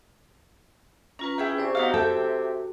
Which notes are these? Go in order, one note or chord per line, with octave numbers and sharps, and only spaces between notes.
C#4 F4 B4 A#5
E4 G#4 G5
C3 C5 D5 C#6
B3 D#4 F#4 F5
A4 E5 G5